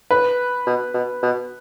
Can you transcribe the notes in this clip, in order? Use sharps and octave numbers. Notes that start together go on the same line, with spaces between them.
A2 B4
B2
B2
B2